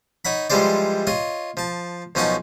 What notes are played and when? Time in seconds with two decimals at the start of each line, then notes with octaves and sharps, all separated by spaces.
0.25 D#4 C#5 F#5 B5
0.50 E3 F3 G3 G#3 C5 D5
1.07 F4 C#5 D#5
1.57 F3 A5
2.15 B1 F3 C#4 D#4 F#5 A5